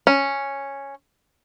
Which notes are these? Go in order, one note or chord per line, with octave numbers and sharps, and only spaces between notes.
C#4